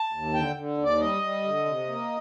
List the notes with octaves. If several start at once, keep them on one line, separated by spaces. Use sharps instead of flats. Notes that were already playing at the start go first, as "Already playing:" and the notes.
Already playing: A5
D#2
D3 G5
D3
D#2
D5
G3 D#5
G3
D3
C3
A#3